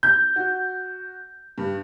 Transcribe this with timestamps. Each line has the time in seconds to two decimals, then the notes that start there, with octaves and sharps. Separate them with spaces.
0.03 G6
0.36 F#4
1.58 G2